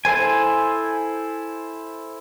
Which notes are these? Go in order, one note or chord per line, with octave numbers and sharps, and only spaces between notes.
E4 A4 C5 G#5